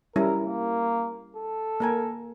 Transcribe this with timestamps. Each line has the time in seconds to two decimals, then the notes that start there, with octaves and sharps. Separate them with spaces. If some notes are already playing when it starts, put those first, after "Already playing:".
0.16 G3 C#4 E4 A#4
0.46 A#3
1.37 A4
1.80 A#3 A#4 G#5